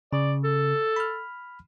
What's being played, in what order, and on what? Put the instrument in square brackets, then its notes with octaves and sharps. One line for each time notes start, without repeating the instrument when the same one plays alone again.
[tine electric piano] C#3 [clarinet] D5
[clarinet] A4
[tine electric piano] B5 F6